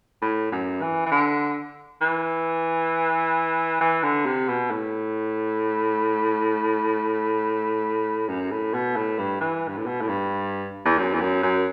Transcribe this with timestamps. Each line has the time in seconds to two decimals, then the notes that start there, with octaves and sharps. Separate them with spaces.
0.22 A2
0.52 F#2
0.82 E3
1.06 E3
1.11 D3
2.01 E3
3.81 E3
4.03 D3
4.25 C3
4.48 B2
4.71 A2
8.29 F#2
8.51 A2
8.74 B2
8.96 A2
9.18 G2
9.41 E3
9.68 G2
9.77 A2
9.86 B2
10.01 A2
10.08 G2
10.85 E2
10.98 F#2
11.13 E2
11.21 F#2
11.43 F#2